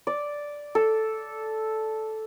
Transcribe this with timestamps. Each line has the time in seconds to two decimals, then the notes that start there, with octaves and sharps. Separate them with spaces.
0.07 D5
0.75 A4